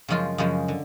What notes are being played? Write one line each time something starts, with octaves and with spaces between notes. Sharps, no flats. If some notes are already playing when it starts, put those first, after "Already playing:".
F#2 C#3 F3 G#3 F4
F#2 C#3 F3 G#3
D3